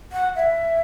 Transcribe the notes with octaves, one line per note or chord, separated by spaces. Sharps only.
F#5
E5